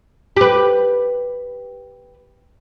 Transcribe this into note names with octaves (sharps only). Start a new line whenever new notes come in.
G4 B4